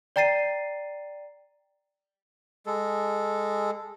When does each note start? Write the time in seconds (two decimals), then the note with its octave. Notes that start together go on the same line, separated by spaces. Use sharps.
0.16 D5 G5 A#5 A6 C7 D#7
2.66 G#3 A4